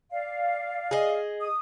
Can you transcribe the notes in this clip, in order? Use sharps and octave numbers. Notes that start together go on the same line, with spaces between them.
D5 F5
G#4 D#5
D#6